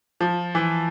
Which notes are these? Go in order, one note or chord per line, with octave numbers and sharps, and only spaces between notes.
F3
E3